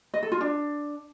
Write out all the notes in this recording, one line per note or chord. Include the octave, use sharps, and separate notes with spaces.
D#5
A4
F4
D4